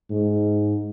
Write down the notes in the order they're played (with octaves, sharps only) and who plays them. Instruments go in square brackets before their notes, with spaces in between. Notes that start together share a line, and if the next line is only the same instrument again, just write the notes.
[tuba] G#2